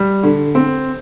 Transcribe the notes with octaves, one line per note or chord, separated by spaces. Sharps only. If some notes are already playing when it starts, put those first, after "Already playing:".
Already playing: G3
D3
C4